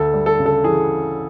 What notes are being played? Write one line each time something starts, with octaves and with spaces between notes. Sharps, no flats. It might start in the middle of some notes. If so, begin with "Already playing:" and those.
Already playing: D2 A4
G3
A4
C#3
A4
E3 G#4